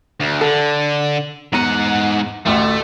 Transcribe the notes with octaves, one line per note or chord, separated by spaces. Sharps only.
D2
D3 A4
E2 G#2 F#5 A#5 D#7
A1 D2 A3